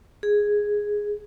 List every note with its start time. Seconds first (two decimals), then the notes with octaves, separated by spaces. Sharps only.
0.23 G#4